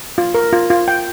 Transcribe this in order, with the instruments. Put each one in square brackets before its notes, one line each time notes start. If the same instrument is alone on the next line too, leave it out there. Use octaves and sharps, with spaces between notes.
[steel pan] F4
A#4
F4
F4
G5